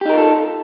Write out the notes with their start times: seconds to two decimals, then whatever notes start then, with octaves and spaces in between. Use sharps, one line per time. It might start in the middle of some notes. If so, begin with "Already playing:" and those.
0.01 G4
0.05 D#4
0.10 A#4
0.14 F4
0.18 A4